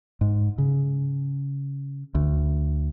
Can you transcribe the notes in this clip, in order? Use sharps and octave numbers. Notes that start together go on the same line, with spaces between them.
G#2
C#3
D2